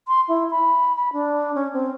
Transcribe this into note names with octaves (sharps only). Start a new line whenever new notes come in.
C6
E4
B5
B5
D4
C#4
C4